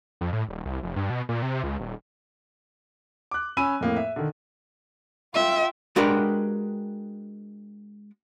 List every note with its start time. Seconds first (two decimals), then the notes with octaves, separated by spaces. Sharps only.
0.21 F2
0.33 A2
0.49 D#1
0.66 C2
0.83 F1
0.96 G2
1.10 B2
1.29 A#2
1.42 C3
1.63 C#2
1.80 D#1
3.31 D6 F#6
3.57 C#4 G#5 B5 E6 D#7
3.81 F2 A2 A#3
3.96 E5
4.16 D3 D#3
5.35 F4 E5 G5
5.96 G#3 D4 F#4 G4 A#4 B4